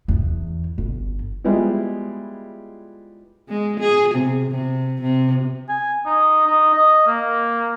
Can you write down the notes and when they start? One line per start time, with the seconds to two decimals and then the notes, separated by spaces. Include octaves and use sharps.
0.08 E2
0.78 G1
1.44 F3 G3 G#3 B3 E4
3.49 G#3
3.80 G#4
4.14 C3
4.51 C3
5.01 C3
5.69 G#5
6.06 D#4
6.47 D#4
6.73 D#5
7.07 A#3